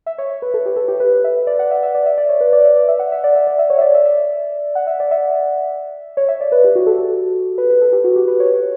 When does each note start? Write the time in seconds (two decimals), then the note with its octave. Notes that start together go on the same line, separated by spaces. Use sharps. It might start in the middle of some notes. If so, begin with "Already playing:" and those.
0.06 E5
0.18 C#5
0.42 B4
0.54 A4
0.66 G4
0.76 A4
0.88 G4
1.00 B4
1.24 E5
1.47 D5
1.59 F#5
1.71 E5
1.83 E5
1.95 D5
2.06 E5
2.18 D5
2.29 C#5
2.41 B4
2.53 D5
2.65 E5
2.76 D5
2.88 E5
2.99 F#5
3.12 E5
3.24 D5
3.35 E5
3.47 D5
3.59 E5
3.70 C#5
3.78 E5
3.81 D5
3.94 E5
4.05 E5
4.17 E5
4.75 F#5
4.87 E5
5.00 D5
5.11 E5
6.17 C#5
6.29 E5
6.41 D5
6.52 B4
6.64 G4
6.76 F#4
6.87 A4
6.99 A4
7.58 B4
7.70 B4
7.81 A4
7.93 G4
8.04 F#4
8.16 G4
8.28 B4
8.40 C#5